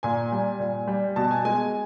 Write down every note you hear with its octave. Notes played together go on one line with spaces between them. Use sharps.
A#2 G#5
G3
A#2
G3
B2 A5
G#5
G#3 G#5